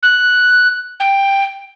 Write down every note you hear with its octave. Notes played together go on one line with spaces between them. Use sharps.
F#6
G5